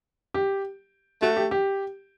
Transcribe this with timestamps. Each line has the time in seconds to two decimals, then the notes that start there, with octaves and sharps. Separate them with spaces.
0.34 G4
1.22 A3 F#4
1.37 G4
1.51 G4